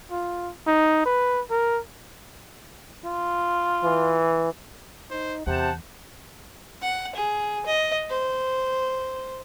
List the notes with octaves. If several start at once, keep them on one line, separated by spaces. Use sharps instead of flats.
F4
D#4
B4
A#4
F4
E3
D#4 C5
E2 C3 F#5 A5 G6
F#5
G#4
D#5
C5